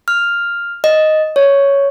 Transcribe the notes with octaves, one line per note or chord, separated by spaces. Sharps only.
F6
D#5
C#5